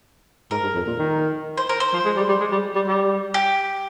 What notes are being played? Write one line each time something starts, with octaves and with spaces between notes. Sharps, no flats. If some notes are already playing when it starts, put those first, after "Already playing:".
G#2 A#4
G2
F2
A#2
D#3
C5
A#4
C5
F3
G#3
G3
G3
G#3
G3
G3
G3
G4